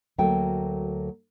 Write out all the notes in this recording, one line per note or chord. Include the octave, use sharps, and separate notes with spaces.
D2 F#3 A3 A#3 G5